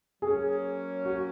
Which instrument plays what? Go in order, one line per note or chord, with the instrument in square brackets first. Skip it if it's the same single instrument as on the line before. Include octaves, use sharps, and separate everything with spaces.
[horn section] F#3 A#3 C#4 [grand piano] G#4
[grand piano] F#4